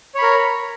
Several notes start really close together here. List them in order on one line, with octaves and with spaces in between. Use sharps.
C#5 B5 A#4